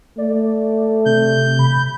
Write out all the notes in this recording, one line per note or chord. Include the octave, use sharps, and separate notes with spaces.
A3 D5
C3 G6
B5